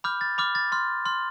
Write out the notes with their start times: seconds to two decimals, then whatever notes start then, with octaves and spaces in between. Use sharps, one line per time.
0.04 B5 D6 F6 G6
0.21 A6
0.38 B5 D6 F6
0.55 A6
0.72 C6 F6
1.05 C6 F6